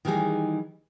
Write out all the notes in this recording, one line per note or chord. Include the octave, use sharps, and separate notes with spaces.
D#3 E3 G3 D#4 G#4